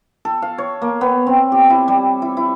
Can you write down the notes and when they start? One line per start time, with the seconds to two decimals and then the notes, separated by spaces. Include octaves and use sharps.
0.25 A4
0.42 F5
0.58 C#5
0.82 A#3
1.01 B3
1.27 C4
1.52 G4
1.70 E4
1.88 G3
2.22 E4
2.37 E4